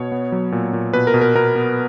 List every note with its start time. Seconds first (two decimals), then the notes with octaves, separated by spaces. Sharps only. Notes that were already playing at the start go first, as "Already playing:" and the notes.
Already playing: B2 C#5
0.12 B3
0.32 F#3
0.52 A#2
0.73 A#2
0.93 B2 B4
1.07 A#4
1.14 B2
1.21 A#4
1.35 B2 A#4
1.56 B3